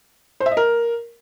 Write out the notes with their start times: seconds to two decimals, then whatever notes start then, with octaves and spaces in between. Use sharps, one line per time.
0.40 C5
0.46 E5
0.51 D#5
0.57 A#4